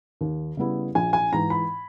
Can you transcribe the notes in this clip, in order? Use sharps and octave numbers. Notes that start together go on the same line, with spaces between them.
D#2
C#3 G3 B3 E4
A#1 G#5
G#5
G#2 E3 A#5
B5